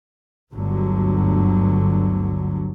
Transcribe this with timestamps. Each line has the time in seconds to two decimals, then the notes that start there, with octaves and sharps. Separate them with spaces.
0.53 G1 D2 G2 D3 F#3